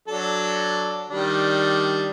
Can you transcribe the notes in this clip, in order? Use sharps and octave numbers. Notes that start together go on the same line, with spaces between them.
F#3 D4 A4
D#3 G3 D4